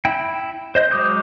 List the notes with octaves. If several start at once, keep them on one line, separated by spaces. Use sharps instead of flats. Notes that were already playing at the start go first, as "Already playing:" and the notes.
E4 G5
C5 D#5 G6
F#3 G#3 D6 D#6 G6